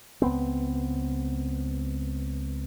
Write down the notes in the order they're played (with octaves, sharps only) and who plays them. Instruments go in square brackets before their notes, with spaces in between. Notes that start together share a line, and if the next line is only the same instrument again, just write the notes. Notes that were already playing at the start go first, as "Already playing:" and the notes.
[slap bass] C#2 B3 C4